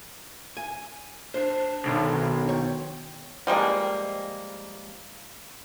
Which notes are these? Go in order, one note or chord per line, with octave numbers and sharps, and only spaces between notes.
G#5
D4 C5
B1 B2 D#3
C#5 G5
F3 G3 G#3 A#3